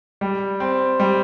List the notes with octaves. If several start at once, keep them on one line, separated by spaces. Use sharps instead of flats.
G3
C4
G3